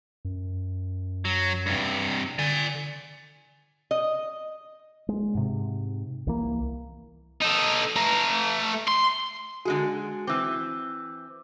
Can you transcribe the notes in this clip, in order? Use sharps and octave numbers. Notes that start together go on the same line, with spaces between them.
F#2
F#3
G2 C3
D3 D5 G#5
D#5
G#3
G#2 C3
C2 E3 A#3
D#4 A4
A3 A#5
C6
D3 G#3 F#4 G#4
E3 C4 D6 E6